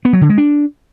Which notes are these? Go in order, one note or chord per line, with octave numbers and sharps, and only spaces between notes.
B3
F#3
D3
G#3
D4